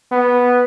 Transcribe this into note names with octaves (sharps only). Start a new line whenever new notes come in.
B3